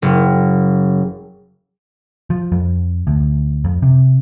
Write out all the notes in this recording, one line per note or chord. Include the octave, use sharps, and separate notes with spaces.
F#1
F3
F2
D2
F2
C3